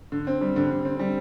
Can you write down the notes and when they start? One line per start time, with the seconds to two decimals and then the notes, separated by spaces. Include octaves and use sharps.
0.12 D3
0.27 C4
0.41 G3
0.56 D3
0.71 D3
0.85 C4
0.99 G3